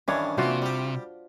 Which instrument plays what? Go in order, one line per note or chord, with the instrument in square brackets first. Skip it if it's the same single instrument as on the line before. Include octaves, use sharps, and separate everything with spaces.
[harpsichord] G2 D#3 E3 [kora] C#4 D4 C#5
[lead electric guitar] C3 [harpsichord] E3 A#3 [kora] F4 F#4 C5
[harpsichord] G3 G4